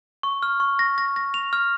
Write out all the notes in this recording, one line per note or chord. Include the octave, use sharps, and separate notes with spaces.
C#6
F6
C#6
A#6
A#6
A#6
F7
F6